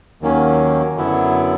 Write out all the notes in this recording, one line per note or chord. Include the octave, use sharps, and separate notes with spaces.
D#2 D#3 F#3 A#3 C#4
F#2 D3 F#3 B3 E4